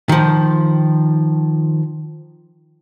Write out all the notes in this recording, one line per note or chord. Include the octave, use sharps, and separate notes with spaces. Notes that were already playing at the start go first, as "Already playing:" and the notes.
D#3 F3